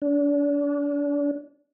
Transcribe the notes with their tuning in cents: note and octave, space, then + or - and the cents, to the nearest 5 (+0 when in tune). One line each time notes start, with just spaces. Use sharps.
D4 -35